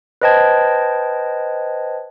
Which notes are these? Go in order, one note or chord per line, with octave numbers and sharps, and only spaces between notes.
B4 C5 D#5 G5 A5 G#6